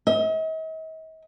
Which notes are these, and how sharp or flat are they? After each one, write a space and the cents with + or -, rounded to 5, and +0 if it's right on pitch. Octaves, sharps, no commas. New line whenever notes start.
D#5 +45